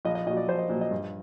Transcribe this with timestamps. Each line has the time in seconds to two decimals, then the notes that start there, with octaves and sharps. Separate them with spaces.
0.05 A#1 D#5
0.15 D#5
0.27 A#2 D#5
0.30 F#3
0.37 D5
0.48 A#1 C5
0.59 D#5
0.69 A#2 F#3
0.81 D#5
0.91 G2